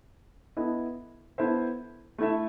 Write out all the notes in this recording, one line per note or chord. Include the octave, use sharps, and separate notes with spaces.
B3 E4 A4 D#5
B3 E4 A4 C5 E5
A3 E4 A4 E5